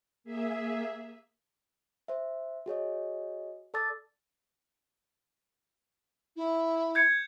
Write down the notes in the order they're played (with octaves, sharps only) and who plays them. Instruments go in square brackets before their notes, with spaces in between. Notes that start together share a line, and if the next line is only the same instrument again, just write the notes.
[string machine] A#3 G#4 E5
[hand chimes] C5 E5
F#4 G#4 C#5 D#5
A4 D5 A5 D6 E6 A6
[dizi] E4
[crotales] G6 G#6 C#7